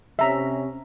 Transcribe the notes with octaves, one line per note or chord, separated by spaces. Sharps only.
C3 C#4 E5 A#5